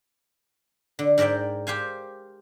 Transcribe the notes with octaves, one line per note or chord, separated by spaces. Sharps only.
D3
G#2 A#4 D5 E5 G5
G4 C5 F5 G#5